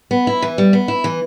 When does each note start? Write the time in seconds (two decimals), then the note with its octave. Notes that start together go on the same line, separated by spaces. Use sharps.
0.11 B3
0.27 E4
0.42 E3
0.58 G3
0.73 B3
0.88 E4
1.04 E3